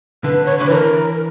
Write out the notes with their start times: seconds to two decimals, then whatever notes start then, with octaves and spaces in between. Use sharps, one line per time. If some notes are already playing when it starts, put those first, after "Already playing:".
0.24 D3 B4
0.46 C#5
0.58 D3 B4
0.70 E3 A#4